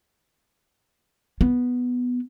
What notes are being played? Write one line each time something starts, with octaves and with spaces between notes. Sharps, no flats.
B3